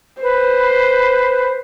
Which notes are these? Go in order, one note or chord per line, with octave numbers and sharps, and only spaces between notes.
B4 C5